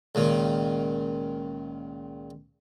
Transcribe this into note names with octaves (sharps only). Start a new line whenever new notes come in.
C#2 A#2 D#3